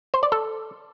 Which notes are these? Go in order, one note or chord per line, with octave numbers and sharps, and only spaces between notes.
C5
D5
A4